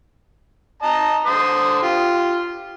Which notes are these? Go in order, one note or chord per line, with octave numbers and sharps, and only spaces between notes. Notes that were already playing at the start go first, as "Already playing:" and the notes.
D#5 A5 A#5
D3 C5 D#6
F4 G4